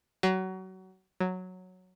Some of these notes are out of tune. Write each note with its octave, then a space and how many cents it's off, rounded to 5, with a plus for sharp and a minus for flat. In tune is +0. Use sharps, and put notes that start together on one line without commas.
F#3 +25
F#3 -5